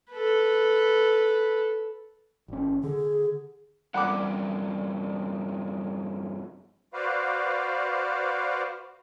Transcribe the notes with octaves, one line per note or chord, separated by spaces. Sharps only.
A4 B4
G#1 C#4
D3 G#4
E2 G2 F#5 B5 D6
F#4 B4 C5 D5 F5